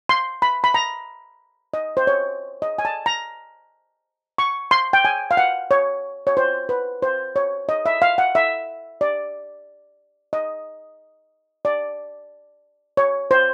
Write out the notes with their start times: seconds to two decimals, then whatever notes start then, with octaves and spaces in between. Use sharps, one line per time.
0.09 C6
0.42 B5
0.64 B5
0.74 A#5
1.74 D#5
1.97 C5
2.07 C#5
2.62 D#5
2.79 G#5
2.85 A5
3.06 A#5
4.38 C#6
4.71 C6
4.93 G5
5.05 G#5
5.31 F5
5.37 F#5
5.71 C#5
6.27 C#5
6.37 C5
6.69 B4
7.02 C5
7.36 C#5
7.69 D#5
7.86 E5
8.02 F5
8.18 F#5
8.35 E5
9.01 D5
10.33 D#5
11.65 D5
12.97 C#5
13.31 C5